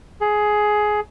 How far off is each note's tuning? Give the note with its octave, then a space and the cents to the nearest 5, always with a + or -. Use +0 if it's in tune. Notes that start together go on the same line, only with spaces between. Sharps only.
G#4 +15